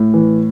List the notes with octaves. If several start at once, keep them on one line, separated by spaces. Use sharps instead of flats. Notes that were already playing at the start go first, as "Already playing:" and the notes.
Already playing: A2
E3